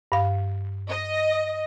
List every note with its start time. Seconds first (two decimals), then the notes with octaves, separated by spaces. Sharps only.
0.12 G2 F5
0.88 D#5